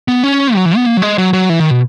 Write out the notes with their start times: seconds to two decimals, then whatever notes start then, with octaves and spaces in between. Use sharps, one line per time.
0.08 B3
0.24 C#4
0.55 F#3
0.66 E3
0.76 B3
0.86 A#3
0.97 F#3
1.02 G#3
1.18 F#3
1.33 F#3
1.50 E3
1.60 D#3
1.70 B2